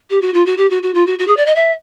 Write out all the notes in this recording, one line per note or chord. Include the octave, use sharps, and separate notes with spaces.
G4
F#4
F4
F#4
G4
F#4
F#4
F4
F#4
F#4
G#4
D5
D#5
E5